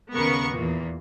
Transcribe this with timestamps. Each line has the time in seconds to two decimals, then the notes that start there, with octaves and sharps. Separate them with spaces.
0.14 D#2 C#3 B3 A#4 C#6
0.51 E2 A#2